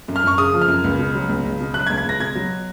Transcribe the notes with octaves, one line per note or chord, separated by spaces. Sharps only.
F#2
F6
F#2 C#6
C#3 D#6
F3
F6
F#2
C#2
B2
F#3
C#2
C#2
B2
F#3 F#6
G#6
C#2
G#6
C#2 A#6
B2 G#6
F#3